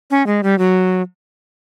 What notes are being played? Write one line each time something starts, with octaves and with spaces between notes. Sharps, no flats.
C#4
G#3
G3
F#3